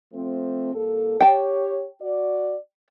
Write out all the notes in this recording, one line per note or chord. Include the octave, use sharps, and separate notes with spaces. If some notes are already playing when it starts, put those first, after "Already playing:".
F3 A3 C4
C2 A#3 A4
G4 C#5 G5 A5
F#4 D5